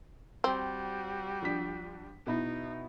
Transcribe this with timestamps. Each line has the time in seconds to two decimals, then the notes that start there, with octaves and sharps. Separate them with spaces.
0.44 G3 C4 F#4
1.42 F3 D4 B6
2.27 B2 D#4 E4